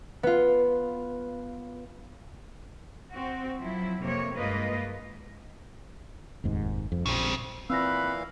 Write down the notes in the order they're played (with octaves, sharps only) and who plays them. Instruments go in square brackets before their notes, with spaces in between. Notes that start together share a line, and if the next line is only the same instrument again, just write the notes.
[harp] B3 F4
[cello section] C4 F#4
F3 F#3 E4
F2 C3 A#3 C#5
G2 G#3 A#3 F4 B4 D#5
[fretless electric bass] F1 D#2 G#2
F2
[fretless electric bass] A#1 [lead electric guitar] C#3 C4
[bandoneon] A#2 E3 F5 [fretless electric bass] C4 [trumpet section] F#5 B5 [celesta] E6 A#6